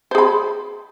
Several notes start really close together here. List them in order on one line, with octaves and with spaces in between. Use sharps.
C5 G#4 B5